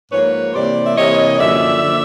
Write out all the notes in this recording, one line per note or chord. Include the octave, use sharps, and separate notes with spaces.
G#2 F3 A#3 B4 C#5
C3 E3 G3 A#3 C5 D5
E5
C3 E3 G3 A#3 C#5 D#5
F#2 D3 F3 A#3 D5 E5
D3 F3 A#3